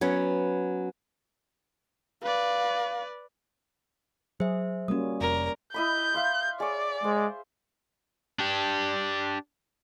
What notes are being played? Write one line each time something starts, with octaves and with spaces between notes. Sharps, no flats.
F#3 B3 C#4
B4 D5 F5
F#3 G#4 C5 E5
G3 A#3 C#4 F#4 D#6
F1 A#4 D5
E4 D#5 B5 G6
E5 F5 C6
G#4 C#5 D5
G#3 C5
D4 G4